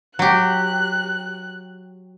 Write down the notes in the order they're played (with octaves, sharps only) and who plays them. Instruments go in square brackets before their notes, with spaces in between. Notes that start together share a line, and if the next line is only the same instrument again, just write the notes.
[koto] F#3 G4 [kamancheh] F#6